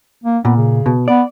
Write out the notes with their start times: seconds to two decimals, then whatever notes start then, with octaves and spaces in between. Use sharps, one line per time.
0.24 A#3
0.45 A#2 B3
0.57 C#3
0.86 B2
1.08 B3 D5